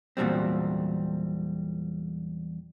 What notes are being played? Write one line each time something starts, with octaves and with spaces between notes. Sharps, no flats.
E2 A#2 F#3 G3 C4